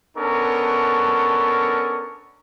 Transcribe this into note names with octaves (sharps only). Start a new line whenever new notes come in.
B3 C#4 D4 A4 A#4 C#6